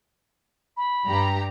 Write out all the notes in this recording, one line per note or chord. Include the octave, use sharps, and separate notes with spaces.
B5
G2 G4 A#5